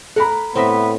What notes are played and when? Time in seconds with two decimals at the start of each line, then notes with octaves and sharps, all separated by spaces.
0.16 A4 A#4 F#5 B5
0.55 A2 B3 C4 C5 D#5 E5